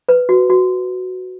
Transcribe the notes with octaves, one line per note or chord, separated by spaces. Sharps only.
B4
F#4
F#4